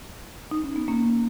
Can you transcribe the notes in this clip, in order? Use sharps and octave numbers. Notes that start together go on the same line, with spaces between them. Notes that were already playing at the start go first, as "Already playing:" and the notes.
D#4
C#4
B3
A#3 C#4